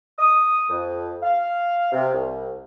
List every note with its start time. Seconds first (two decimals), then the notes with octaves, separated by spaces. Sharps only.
0.19 D#6
0.69 F2
1.22 F5
1.92 C3
2.13 C2